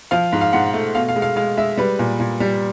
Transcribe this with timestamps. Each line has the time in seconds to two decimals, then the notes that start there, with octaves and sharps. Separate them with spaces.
0.11 F3 F5
0.33 G#2
0.41 F5
0.53 G#2 F#5
0.73 A3
0.94 B2 F5
1.09 F5
1.16 G#3
1.22 F5
1.36 G#3 F5
1.57 G#3 E5
1.77 G3 B4
1.99 A#2
2.20 A#2
2.40 G3